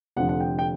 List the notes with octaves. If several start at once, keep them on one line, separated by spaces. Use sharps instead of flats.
F1 F2 D3 F3 F#5
F#5
G5
G5